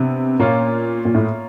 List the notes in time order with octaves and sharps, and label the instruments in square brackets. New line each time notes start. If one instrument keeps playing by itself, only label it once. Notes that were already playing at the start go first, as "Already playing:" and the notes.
Already playing: [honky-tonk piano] C3 [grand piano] B3 D4
[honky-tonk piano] A#2 [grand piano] A#3 C#4 F4
[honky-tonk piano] A#2
A2